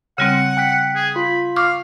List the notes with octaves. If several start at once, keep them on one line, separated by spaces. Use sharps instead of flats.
C#3 G3 C4 F#5
G5 F#6 B6
G#4
F4 B5
F5 C#6 D6 F6